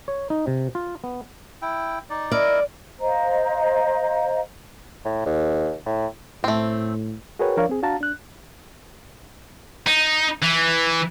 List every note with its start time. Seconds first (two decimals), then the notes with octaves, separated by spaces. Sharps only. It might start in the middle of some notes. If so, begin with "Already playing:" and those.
0.08 C#5
0.30 D#4
0.47 C3
0.75 F4
1.04 B3
1.62 E4 G5
2.10 D#4 D5
2.32 E4 A#4 D5 D#5
3.00 C5 D#5 F5 A#5
5.05 A2
5.26 D#2
5.86 A2
6.44 A2 A3 C4
7.39 F#4 G#4 A#4 B4 C#5 G5
7.57 F3 D4 A#4 C#5 D5 F5
7.69 C4 G#4
7.82 D4 F#4 F5 A5 A#5
8.01 D4 F#6
9.86 D#4
10.42 E3